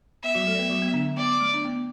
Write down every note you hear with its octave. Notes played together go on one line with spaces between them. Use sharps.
B3 E5
F#3 F#4
A3 A4
D5
B3 B4
F#3 F#4
B3
D3 D4
B3 D5
A3
D4
B3